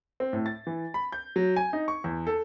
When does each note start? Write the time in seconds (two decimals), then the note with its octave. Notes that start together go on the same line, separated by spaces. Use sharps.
0.20 C4
0.33 A2
0.46 A6
0.67 E3
0.94 B5
1.12 G6
1.36 F#3
1.56 G#5
1.73 D#4
1.88 C#6
2.04 E2
2.27 A4